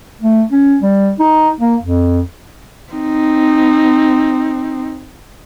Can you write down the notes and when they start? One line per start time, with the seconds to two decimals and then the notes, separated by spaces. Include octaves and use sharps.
0.21 A3
0.52 C#4
0.83 G3
1.20 D#4
1.61 A#3
1.83 F2
2.93 C4 D#4